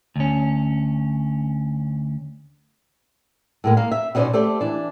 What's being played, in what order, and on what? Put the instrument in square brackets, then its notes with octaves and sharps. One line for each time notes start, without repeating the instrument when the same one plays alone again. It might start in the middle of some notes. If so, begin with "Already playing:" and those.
[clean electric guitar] D2 C#4
[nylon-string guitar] A2 G#3 A#3
A#3 F5
E5
B2 C#4 D#4 A4 C5 D5
A3 G4 A4 C5 D5
E3 D4